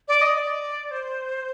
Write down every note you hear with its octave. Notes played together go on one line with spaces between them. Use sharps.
D5
D#5
D5
C5